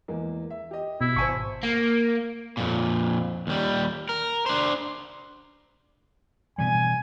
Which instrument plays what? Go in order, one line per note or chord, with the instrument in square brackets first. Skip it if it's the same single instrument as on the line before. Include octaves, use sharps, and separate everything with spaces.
[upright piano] E2 G#3 A#3
E5
G4 D#5
[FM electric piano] B2 [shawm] E4
[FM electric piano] G#1 C#6 [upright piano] C5 G#5 A5
[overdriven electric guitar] A#3
F2 A#2
D#2 G3
A#4
D4 C5
[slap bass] B2 E3 G3 [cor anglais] G#5